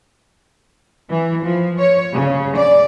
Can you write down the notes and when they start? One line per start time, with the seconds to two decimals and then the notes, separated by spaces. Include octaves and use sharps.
1.09 E3
1.44 F3
1.79 C#5
2.14 C#3
2.57 D5